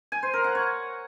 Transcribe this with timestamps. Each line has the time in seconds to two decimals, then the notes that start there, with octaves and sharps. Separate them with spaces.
0.12 G#5
0.23 C5
0.33 A#4
0.44 F#5
0.55 C#5